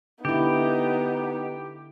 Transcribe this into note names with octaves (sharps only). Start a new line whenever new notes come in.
D3 B3 D#4 E4 G4